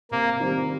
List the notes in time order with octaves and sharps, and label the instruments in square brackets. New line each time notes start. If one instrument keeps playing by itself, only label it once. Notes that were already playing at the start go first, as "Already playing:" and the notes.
[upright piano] C3 [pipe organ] A#3
[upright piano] D#3 G3 C4